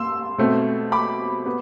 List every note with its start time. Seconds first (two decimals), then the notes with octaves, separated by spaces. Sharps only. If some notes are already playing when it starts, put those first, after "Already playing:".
Already playing: C6 E6
0.38 B2 A3 C4
0.92 B5 D6
1.46 B3